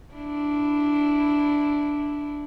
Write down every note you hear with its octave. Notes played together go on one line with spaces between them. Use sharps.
D4 E4